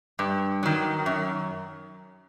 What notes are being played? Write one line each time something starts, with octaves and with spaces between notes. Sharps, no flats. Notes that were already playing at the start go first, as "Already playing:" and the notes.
G2
D#3 F#3
F#2